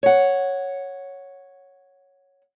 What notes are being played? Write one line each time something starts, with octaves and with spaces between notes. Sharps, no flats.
C#5 F#5